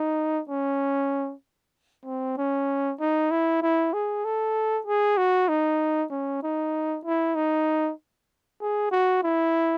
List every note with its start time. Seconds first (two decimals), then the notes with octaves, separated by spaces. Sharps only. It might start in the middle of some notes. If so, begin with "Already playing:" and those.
Already playing: D#4
0.50 C#4
2.05 C4
2.38 C#4
3.00 D#4
3.31 E4
3.62 E4
3.93 G#4
4.25 A4
4.87 G#4
5.17 F#4
5.49 D#4
6.11 C#4
6.43 D#4
7.05 E4
7.35 D#4
8.61 G#4
8.91 F#4
9.23 E4